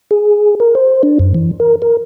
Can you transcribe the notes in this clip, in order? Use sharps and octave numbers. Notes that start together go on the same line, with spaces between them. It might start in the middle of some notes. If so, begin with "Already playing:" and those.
G#4
A#4
C5
D4
F#2
E3
A#4
A#4